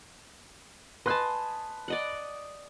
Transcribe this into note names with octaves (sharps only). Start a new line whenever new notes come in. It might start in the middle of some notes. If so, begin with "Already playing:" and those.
B4 D#5 G#5 A5 C6 F#6
D5 D#5 F#5